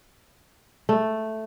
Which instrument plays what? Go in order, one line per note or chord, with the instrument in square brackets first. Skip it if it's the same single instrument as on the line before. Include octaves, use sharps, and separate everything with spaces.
[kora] A3